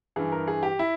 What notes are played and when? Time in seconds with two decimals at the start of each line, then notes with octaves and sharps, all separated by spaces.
0.16 G2 E3 G#4
0.32 A#4
0.47 G#4
0.63 G4
0.79 E4